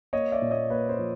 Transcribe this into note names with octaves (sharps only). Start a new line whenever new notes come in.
A#3 C#5 D#5
D5 E5
A#2
C#5 D#5
A#3 B4 C#5
C5
F3